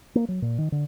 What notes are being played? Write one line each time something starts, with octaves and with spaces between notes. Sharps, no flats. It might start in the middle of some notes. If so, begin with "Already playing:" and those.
A#3
F#3
A#2
D#3
D3